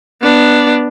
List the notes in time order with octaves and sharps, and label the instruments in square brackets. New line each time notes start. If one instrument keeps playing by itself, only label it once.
[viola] B3 D4